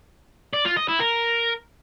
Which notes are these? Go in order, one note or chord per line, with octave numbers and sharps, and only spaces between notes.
D5
F4
D#5
E4
A#4